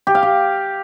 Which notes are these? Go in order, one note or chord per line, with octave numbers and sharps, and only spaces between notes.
G4
F5
G4